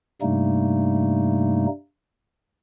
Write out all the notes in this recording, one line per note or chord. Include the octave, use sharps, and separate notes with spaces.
G2 C3 G3 A3 A#3 D#4